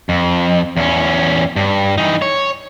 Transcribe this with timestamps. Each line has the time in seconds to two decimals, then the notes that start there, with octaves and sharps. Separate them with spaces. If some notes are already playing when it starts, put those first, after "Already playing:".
0.09 F2
0.77 E2 C#4
1.56 G2
1.98 E3 D#4
2.22 C#5